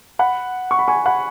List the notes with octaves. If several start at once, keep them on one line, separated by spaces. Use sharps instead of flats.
F#5 B5
C#6
B5
G#5 C#6
F#5 B5